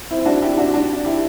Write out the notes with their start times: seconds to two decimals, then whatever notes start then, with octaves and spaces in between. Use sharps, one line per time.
0.11 C4 E4
0.25 D4 F#4
0.42 E4 G4
0.57 D4 F#4
0.74 D4 F#4
1.05 E4 G4